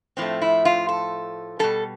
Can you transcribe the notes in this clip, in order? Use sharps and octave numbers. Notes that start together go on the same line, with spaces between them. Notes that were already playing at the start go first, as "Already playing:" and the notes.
A2 F3 A3 C4
E4
F4
A4
B2 G3 A4